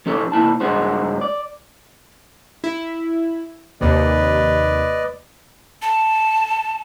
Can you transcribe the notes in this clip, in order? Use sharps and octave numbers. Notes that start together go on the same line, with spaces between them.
F3 C#4 G4 A4
C3 A#3 E4 A5
G2 C#3 G#3 F#4 C5
D5
E4
D#2 C3 B4 D5 D#5
A5